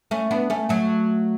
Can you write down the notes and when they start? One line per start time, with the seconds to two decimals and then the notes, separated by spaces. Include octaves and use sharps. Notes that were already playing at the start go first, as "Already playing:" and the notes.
0.11 A3 C#4
0.31 B3 D4
0.50 A3 C#4
0.69 F#3 A3